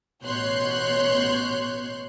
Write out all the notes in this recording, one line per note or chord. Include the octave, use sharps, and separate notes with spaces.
A1 B2 C#5 C6 F#6 G6